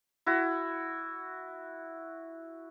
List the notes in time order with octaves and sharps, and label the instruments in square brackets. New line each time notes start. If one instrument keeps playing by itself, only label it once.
[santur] E4 F#4